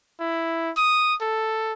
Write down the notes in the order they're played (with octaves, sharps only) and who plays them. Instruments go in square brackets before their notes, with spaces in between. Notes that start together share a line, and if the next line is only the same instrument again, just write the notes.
[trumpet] E4
D#6
A4